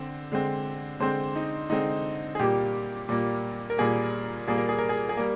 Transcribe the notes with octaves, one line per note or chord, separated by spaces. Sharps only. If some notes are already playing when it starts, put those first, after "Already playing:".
Already playing: D3 C4
D3 G#3 C4
D3 G#3 C4 C5
D#4
D3 G#3 C4 D#4
G#4
A#2 G3 A#3 G4
A#2 G3 A#3
A#4
A#2 G3 A#3 G#4
A#2 G3 A#3 G#4
A#4
G#4
A#4
G#4
G#4
G3 A#3 A#4